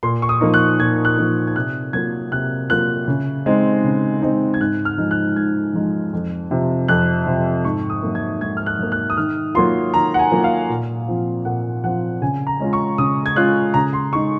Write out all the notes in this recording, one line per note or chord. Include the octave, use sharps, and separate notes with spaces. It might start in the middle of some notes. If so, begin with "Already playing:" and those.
A#2 C6
C#6
D#6
F3 A#3 D#4
F#6
A#2 G#6
F#6
F3 A#3 D#4
G#6
C3 F#6
F#3 A#3 F4 G#6
C3 F#6
F#3 A#3 F4 F#6
C#3
G#3 C4 D#4
C#3
G#3 C4 D#4
G#6
G#2 F#6
F6
F3 G#3 D#4
F#6
G#2 G#6
F3 G#3 D#4
F2
C3 F3
F2 F#6
C3 F3
G#2 C#6
D#6
F#3 A#3
G#6
G#2 G#6
F6
F#6
F#3 A#3
F#6
D#6
D#3 F6
F#3 A#3 F4 C6
D#3 A#5
F#5
G#5
F#3 A#3 F4
F5
A#2
F3 C4 F4
A#2 F#5
F3 C4 F4 F#5
C#3 G#5
A#5
G#3 C#4 F4
C#6
C#3 D#6
G#6
G#3 C#4 F4 F#6
C#3 A#5
C6
G#3 D#4 C#6